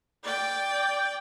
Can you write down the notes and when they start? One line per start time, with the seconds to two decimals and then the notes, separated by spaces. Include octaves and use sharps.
0.23 D5 G5